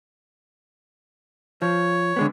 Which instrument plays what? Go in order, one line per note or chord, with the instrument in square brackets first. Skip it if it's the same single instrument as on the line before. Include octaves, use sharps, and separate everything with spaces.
[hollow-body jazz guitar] F3 [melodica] C#5
[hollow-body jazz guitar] D3 G#3 B3